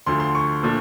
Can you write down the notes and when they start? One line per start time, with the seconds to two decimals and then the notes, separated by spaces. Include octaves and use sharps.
0.06 D2 D3 F3 C6
0.20 C6
0.35 C#6
0.63 A#2 F3 A3 D4